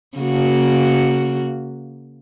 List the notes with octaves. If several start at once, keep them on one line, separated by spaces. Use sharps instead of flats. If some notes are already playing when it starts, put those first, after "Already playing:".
C#3 A#3 F#4